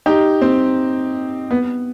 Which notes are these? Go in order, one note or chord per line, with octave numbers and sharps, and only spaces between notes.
D#4 G4
C4
B3